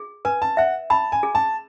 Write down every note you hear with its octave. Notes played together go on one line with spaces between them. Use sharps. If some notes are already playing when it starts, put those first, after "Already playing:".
Already playing: G#4
B4 G#5
A5
E5 F#5
A5 B5
G#5
G#4
A5